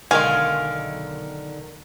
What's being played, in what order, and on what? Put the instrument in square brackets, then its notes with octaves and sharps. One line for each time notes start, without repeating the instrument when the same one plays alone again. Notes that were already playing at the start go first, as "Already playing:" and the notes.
[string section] B1 [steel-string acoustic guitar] D3 D#3 A#4 [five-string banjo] G#3 G#5 [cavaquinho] F5